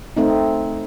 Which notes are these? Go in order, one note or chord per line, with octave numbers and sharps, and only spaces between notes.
A3 C4 D#4